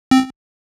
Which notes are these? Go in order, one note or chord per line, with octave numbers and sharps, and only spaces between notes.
C4